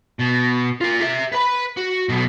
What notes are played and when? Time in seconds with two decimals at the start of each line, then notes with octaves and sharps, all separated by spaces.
0.19 B2
0.81 F4 A#4
1.01 G4 E5
1.32 B4 B5
1.77 F#4
2.09 B1 B2